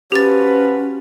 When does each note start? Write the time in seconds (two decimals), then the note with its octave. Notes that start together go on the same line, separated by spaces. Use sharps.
0.12 F3 C#4 F#4 G4 B4 A6